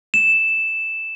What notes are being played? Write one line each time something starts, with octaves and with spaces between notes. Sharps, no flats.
E7